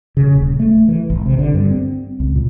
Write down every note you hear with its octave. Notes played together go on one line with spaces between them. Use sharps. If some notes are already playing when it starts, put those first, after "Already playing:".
C#3
D#1
A3
E3
G#1
C3
D3
G2
C4
C#2
A#2